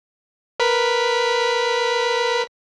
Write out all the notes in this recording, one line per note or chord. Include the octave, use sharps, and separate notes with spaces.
A#4 B4 B6